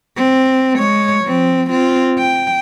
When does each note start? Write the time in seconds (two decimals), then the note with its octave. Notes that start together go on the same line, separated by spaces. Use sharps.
0.17 C4
0.77 G#3 C#5
1.24 F3 C4
1.70 C4 F4
2.18 G5